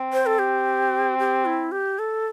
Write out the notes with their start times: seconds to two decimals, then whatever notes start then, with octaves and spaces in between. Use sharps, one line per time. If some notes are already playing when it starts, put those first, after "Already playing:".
Already playing: C4
0.13 C5
0.26 A4
0.39 G4
1.19 G4
1.46 E4
1.72 G4
1.99 A4